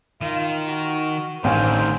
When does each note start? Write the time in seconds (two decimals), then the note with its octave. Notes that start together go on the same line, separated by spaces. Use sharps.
0.21 D#3 F4
0.67 F#4
1.44 A1 D3 D#3 C5 F5 G#5